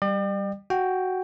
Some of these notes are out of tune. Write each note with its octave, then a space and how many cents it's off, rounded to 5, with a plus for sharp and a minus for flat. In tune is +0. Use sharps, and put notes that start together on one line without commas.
G3 +0 D5 +40 G5 +0
F#4 +5 G5 +0